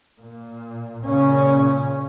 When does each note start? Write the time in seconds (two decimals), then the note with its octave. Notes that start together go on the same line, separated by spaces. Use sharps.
0.18 A#2
1.03 A#2 C#3 C#4